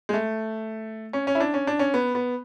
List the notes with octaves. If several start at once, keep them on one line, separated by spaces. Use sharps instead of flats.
G#3
A3
C#4
C#4
E4
D4
C#4
D4
C#4
B3
B3